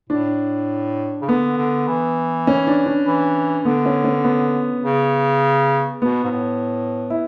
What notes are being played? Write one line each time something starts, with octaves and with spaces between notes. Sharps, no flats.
A2 D4
C#3
D3 B3
D3
E3
C#4
D4
D4
E3
D3 B3
C#4
C#4
B3
C#3
B2 B3
G#2
A2
E4